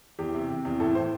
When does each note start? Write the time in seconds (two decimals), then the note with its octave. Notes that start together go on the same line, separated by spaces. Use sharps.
0.19 E2 G4
0.34 C3
0.49 C3
0.65 E2
0.80 A2 A4
0.95 A2 C5